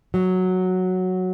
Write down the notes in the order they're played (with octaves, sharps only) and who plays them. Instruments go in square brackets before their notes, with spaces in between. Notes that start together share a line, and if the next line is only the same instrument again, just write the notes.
[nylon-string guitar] F#3